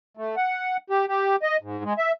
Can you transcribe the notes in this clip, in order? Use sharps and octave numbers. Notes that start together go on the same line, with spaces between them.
A3
F#5
G4
G4
D#5
G#2
G#3
E5